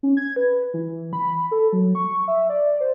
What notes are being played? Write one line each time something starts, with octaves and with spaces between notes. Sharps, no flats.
C#4
G#6
B4
E3
B5
A4
F#3
C#6
E5
D5
C5